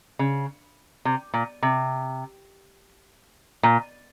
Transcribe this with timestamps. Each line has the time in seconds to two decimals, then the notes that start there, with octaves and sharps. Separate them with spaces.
0.19 C#3
1.05 C3
1.34 A#2
1.62 C3
3.63 A#2